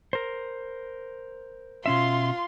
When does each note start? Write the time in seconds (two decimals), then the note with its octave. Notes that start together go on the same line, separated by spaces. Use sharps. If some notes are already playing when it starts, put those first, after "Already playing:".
0.13 A#4 C5
1.86 B2 C#4 F4 E5 C6